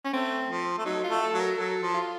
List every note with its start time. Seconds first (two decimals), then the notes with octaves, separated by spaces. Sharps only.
0.05 C#4
0.13 A3 C4
0.49 F3
0.78 A3
0.85 F#3 D#4
1.04 F4
1.10 A3
1.21 A4
1.34 F#3
1.39 A#4
1.58 F#3 A4
1.82 F3
1.94 F4